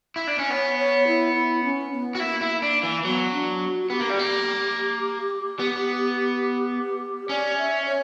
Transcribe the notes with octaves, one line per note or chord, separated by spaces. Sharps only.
E4
D4
C#4
B3 C#5
C#5
E4
E4
C#4
B3
F#4
A#3 E4
E4
D4
E3
F#3 B3
D4
F#4
B3 G4
A#3
G3
A#3
B3
C#4 D5
E5
C#5